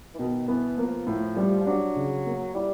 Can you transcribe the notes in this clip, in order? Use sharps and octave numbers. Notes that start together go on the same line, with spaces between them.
E3
B2 D#3
E3 B3
F3 A#3
A2
G3
F3
F#3 D4
C#3
A#3
G3 E4